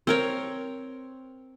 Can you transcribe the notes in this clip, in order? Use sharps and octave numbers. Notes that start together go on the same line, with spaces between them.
C4 A#4 C#5